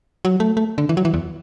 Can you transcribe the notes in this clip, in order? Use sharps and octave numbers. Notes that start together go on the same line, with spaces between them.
F#3
A3
A3
D3
E3
F#3
E3
E2